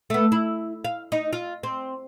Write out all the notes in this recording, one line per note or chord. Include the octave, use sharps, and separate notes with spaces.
A3 B3
E4
F5
D#4
F4
C4